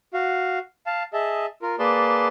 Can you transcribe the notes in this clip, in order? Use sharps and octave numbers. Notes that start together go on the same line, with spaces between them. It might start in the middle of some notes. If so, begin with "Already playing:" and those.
F#4 F5
F5 A5
G#4 D#5 E5 A5
F4 A#4
A#3 G#4 B4 D5 A5 C6